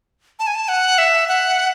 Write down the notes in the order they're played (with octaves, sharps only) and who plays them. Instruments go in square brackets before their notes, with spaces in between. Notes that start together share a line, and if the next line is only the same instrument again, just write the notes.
[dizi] A5
G#5
A5
F#5
E5
F#5